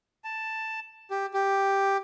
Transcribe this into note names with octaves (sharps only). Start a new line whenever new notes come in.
A5
G4
G4